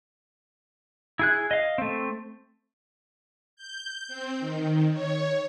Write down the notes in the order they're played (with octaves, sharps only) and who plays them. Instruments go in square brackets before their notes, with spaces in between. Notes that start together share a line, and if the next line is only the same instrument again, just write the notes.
[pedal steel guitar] E4 G#4 F#6
D#5 F5
A3 C4
[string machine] G6
C4
D#3
C#5